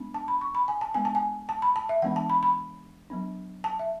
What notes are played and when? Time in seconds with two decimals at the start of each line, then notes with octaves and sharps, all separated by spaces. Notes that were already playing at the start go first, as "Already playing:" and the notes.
Already playing: G#3 B3 D4
0.14 A5
0.28 B5
0.41 C#6
0.55 B5
0.68 G#5
0.81 A5
0.94 G#3 B3 D4 G#5
1.05 A5
1.15 G#5
1.49 A5
1.62 B5
1.76 A5
1.89 E5
2.02 E3 G#3 B3 D4 F#5
2.16 A5
2.30 B5
2.43 B5
3.10 F#3 B3 D4
3.64 A5
3.79 E5